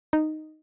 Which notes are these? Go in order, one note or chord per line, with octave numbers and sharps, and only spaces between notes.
D#4